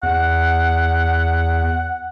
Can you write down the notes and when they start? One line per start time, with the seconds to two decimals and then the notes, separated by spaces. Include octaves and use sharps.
0.03 E2 F#5